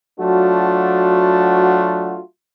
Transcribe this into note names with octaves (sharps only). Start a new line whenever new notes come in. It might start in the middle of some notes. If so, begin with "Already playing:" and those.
F#3 A3 D4 F4 F#4